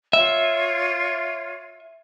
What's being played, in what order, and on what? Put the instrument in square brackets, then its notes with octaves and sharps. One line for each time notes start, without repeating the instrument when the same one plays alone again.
[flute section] F4 C#5 [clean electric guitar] E5